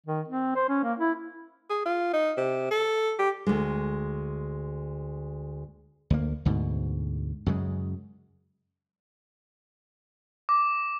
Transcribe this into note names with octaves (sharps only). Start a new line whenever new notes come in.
D#3
C4
C5
C#4
A#3
E4
G#4
F4
D#4
C3
A4
G4
D2 G#3
D2 A#3
D2 G#2 B2
F#2 C#3 G#3
D6